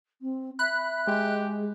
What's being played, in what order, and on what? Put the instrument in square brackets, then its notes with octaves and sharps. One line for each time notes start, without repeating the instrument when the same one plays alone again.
[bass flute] C4
[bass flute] E5 [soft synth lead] B5 [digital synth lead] F#6
[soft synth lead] G#3 [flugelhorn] G4